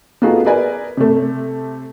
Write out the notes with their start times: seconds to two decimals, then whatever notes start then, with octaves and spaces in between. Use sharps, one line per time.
0.22 B3 D#4 F4 F#4 G#4 A4
0.45 G#4 A#4 B4 D5 G#5
0.97 C3 A3